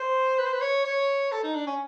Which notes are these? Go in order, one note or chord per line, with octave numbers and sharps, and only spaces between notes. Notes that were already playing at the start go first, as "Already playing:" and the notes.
Already playing: C5
B4
C5
B4
C#5
C#5
A4
D#4
D4
C#4